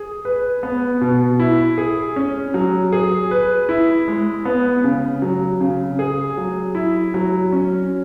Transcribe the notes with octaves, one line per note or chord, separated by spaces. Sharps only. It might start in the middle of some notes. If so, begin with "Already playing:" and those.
Already playing: G#4
B4
B3
B2
E4
G#4
C#4
F#3
G#4
B4
E4
G#3
B3
C#3
F#3
C#3
G#4
F#3
E4
F#3
C#4